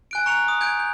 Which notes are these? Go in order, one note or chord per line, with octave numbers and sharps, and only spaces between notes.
G#5 F#6 D7
A#5 C#6 F#6 C#7 F7
D#6
G#5 G6 G#6 D7
G6